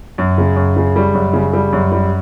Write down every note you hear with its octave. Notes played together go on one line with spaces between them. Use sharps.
F#2
C#3
F#2
C#3
G3
F#2
C#3
G3
F#2
G3